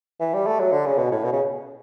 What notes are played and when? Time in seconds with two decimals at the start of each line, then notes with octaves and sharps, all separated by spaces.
0.20 E3
0.34 G3
0.47 A3
0.60 F#3
0.72 D3
0.86 C#3
0.98 B2
1.12 A2
1.24 B2
1.33 C#3